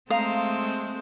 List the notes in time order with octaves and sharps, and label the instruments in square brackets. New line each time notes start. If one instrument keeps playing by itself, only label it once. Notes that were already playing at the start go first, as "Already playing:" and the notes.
[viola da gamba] G#3 A3 C4 [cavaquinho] F5 A#5 D#6